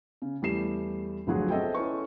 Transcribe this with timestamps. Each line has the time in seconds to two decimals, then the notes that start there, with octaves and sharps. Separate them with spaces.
0.22 C#3
0.42 E2 G3 A3 C7 E7
1.27 G1 D2 F3 F#3 G#4 F#5
1.50 C4 G#4 A4 D#5 E5 G5
1.75 C#4 E4 A4 B4 C#6